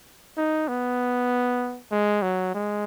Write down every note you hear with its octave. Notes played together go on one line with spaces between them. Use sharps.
D#4
B3
G#3
F#3
G#3